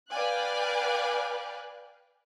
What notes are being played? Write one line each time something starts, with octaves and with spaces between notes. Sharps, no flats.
B4 D5 F5 G5 G#5 F#6